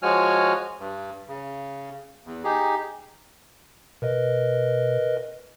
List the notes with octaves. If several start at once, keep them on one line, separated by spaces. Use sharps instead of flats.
F3 G#3 F#4 C#5 G#5 F6
G2
C#3
E2
D#4 G4 G#4
B2 A#4 B4 D#5